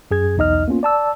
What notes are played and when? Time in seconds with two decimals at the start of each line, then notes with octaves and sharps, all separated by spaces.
0.11 F#2 G#4 G#6
0.37 B1 E2 D#4 D#5 F6
0.68 A#3 B3 C#4 F4
0.83 D5 A5 E6